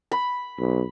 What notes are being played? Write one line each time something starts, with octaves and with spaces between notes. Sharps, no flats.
B5
B1